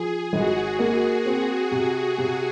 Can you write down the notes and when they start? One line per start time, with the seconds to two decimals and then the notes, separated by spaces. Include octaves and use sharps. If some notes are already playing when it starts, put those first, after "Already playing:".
Already playing: F3 G#4
0.32 G#1 F#4
0.79 A#3
1.26 C4
1.71 C3
2.18 C3